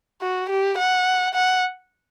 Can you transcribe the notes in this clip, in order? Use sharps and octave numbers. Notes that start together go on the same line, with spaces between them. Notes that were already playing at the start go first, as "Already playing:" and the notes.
F#4
G4
F#5
F#5